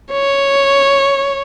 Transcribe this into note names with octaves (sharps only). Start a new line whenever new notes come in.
C#5